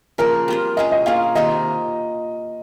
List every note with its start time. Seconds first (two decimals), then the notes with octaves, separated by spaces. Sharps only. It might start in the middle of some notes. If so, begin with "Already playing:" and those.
0.18 C#3 F3 A#3 A#4
0.48 G3 C4 F4
0.77 G#3 C#4 G#4 D#5
0.92 D#5
1.06 A#3 C#4 F4 G#4 F5
1.35 C3 D#3 A#3 F4 D#5